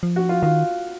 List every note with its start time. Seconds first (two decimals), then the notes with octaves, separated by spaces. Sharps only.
0.03 F3
0.16 F#4
0.29 F4
0.42 D#3 F4